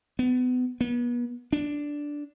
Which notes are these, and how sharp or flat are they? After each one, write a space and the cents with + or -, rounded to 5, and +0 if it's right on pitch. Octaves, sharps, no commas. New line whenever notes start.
B3 +30
B3 -35
D4 -5